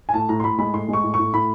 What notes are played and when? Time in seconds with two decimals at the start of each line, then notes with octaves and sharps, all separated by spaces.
0.09 G#5
0.14 A2 A5
0.29 A2 A#5
0.40 C6
0.44 A2 B5
0.58 G#3 B5
0.73 A2 C6
0.88 G#3 C#6
1.03 A2
1.14 A2 C#6
1.33 A2 B5